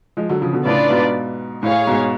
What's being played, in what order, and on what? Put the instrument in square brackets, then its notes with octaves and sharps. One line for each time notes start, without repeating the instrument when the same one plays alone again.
[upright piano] F3 G#3
D3 F#3
C#3 F3
B2 D3
[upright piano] A2 C#3 [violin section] D4 F4 B4 D5
[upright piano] G#2 B2
[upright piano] A2 [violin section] G#4 C#5 F5
[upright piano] G#2 B2